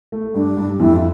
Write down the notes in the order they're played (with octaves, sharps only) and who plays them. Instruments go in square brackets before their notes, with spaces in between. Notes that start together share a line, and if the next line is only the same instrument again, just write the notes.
[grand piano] A3
[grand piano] G2 [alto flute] D4
[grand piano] G2
[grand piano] F2 [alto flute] E4
[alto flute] F4